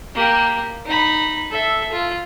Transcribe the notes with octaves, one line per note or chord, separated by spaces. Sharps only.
A#3 G4
D#4 B5
A4 E5
F4